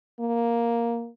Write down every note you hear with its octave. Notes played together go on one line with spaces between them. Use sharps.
A#3